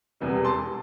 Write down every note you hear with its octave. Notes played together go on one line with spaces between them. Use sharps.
E1 E2 C3 G3 B3
A5 C6